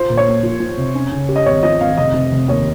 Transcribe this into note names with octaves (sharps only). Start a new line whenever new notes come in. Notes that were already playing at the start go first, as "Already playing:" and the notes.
Already playing: F4 C5
A#2
C#5
A#3
F3
F3
C3
C#4
C#3
G4
D#5
G#1 C#5
F3 D#5
G#1 F5
F1 D#5
C3
F1
D#2 C#5